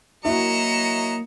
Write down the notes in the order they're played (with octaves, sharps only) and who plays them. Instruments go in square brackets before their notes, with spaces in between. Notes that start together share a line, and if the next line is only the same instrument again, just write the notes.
[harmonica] F#3 D#5 A#5 [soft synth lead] A#3 [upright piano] E4 F#4 [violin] C#7 E7